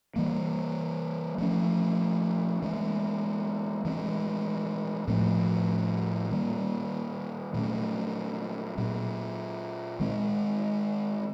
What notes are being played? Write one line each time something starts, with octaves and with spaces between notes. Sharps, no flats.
E3 G3 A#3
F3 A3 C#4
E3 G#3 C#4
E3 G#3 C4
A2 F3 A3 C4
D#3 G3 A#3
A#2 F#3 A3 C#4
A#2 F#3 A#3
D#3 G#3 C4